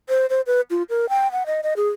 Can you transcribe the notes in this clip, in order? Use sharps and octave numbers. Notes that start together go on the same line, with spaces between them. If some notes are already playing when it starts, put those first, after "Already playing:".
C5
C5
B4
F4
A#4
G5
F#5
D#5
D#5
G#4